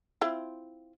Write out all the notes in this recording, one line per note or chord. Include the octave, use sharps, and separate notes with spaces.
C4 E4 F4